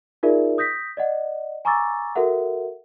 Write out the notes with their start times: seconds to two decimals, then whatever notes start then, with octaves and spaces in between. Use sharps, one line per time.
0.23 D#4 F4 G#4 A#4 D5 E5
0.58 D#6 G6 A#6 B6
0.97 D5 D#5 F#5
1.65 G#5 A#5 C#6 D6 E6 A6
2.16 F#4 A4 A#4 E5 F#5